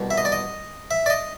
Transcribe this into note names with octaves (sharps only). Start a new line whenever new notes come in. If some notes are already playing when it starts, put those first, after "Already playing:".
Already playing: C2 B2 G3
E5
D#5
D5
D#5
E5
D5
D#5